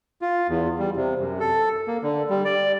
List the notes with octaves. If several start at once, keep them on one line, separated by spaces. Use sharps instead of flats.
F4
E2
G3
C3
F#2
A4
A#3
D3
G3
D5